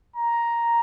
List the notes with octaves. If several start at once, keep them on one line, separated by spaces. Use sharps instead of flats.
A#5